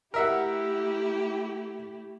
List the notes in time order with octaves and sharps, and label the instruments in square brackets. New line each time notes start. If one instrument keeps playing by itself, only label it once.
[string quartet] A3 E4 G4 [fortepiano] A#4 E5 F#5